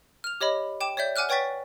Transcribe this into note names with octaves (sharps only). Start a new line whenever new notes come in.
F6 F7
G4 C#5 D#5 B5
G5 D6 E7
C#5 D5 E5 G6
F#5 G#5 D6 F6 F#6
B4 C#5 G5 C#6 A6 B6